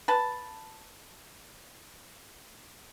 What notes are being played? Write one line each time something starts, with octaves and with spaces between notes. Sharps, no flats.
B4 A5